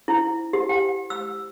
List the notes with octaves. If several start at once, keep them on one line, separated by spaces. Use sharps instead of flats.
E4
G4
G5
E6